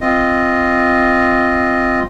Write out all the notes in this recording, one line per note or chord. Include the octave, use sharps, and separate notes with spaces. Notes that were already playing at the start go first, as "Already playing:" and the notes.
C4 F4 D#5